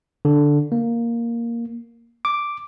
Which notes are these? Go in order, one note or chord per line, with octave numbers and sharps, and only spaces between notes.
D3
A#3
D6